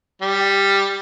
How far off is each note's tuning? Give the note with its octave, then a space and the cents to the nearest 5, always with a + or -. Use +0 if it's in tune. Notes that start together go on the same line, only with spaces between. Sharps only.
G3 +10